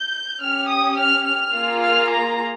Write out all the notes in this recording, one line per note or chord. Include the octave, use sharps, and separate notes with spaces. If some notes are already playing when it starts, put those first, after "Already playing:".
Already playing: G6
C#4 G4 F6
D#6
F6
F6
A#3 F4 G#4
F6
A#5